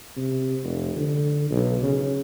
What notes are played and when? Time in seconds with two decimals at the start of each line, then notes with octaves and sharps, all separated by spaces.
0.17 C3
0.64 F1
0.96 D3
1.50 B1
1.82 C#3